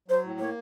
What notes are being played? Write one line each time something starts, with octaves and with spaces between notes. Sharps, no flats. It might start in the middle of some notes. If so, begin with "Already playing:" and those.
F#3 C5
A2
A#3 C#5